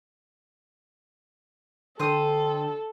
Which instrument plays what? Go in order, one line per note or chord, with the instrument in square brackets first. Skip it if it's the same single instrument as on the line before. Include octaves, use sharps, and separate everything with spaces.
[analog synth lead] D3 [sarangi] A4 [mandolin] C5 G5 D#6